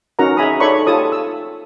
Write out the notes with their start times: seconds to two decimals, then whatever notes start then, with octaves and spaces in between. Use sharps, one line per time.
0.19 C#4 D#4 F#4 A#4 F#5 A#5
0.37 G#4 E5 G#5 A#5 B5 D#6
0.60 D#4 A4 C#5 D5 B5 C#6
0.87 F4 G4 A4 C#5 A5 D#6
1.12 E6